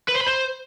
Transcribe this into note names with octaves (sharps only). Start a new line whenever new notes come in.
B4
C5
B5
C5